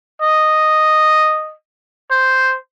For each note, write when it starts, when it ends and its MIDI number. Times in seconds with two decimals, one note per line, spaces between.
0.22 1.53 75
2.11 2.56 72